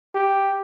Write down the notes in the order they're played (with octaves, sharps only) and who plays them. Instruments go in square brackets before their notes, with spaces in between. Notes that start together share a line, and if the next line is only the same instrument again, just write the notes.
[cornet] G4